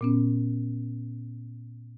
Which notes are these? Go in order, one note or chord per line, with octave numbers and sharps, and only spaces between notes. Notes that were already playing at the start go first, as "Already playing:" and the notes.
A#2 B3 C#4